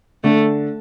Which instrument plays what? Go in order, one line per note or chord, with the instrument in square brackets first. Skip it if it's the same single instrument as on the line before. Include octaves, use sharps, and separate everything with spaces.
[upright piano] D3 [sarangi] A3